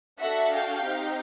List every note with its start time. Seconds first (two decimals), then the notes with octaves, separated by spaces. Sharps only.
0.20 D4 F#4 A4 E5 F#5
0.52 F5 G5
0.84 C4 D#4 G4